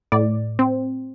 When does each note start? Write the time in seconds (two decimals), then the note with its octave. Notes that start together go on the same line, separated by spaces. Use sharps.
0.12 A2 D5
0.59 C4